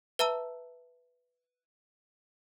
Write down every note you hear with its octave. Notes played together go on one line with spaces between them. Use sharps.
B4 E5 A5 A#5 E6